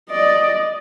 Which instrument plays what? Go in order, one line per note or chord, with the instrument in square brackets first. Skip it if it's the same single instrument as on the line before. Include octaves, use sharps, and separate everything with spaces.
[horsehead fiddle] D5 D#5